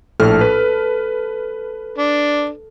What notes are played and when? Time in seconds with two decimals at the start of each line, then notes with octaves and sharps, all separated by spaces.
0.20 A#1 A2 A4 F6
0.41 B4
1.98 D4